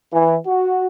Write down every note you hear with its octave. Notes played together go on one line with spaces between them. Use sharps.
E3
F#4